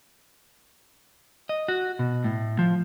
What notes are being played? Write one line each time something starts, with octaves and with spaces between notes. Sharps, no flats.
D#5
F#4
B2
A2
F3